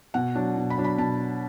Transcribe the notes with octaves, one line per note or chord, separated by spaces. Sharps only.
B2 F#5
F#3 D4
B2
B5
F#3 D4
B5
B2 A5